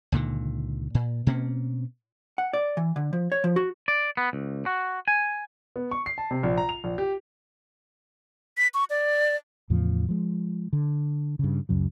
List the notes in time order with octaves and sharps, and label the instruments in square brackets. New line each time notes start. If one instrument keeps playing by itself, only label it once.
[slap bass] C#2 A#2 D3 D#3
A#2
B2 A#3 C4 C#4
[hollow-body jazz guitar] F#5
D5
E3
D3
F3
C#5
F3
F#4
[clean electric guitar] D5
B3
C#2
F#4
G#5
[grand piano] B3
C#6
C7
A5
C3
A#1
A#5
F7
A#1
G4
[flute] B6
C#6
D5
[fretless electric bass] E2 A2 C#3 F3
F3 G#3
D3
G2 C#3
C#2 F#2 C#3 F#3